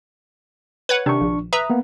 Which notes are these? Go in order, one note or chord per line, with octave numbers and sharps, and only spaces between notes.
B4 C#5 F#5
C3 D#3 D4 C#6
A#1
B4 E5 A#5 D#6
A#3 B3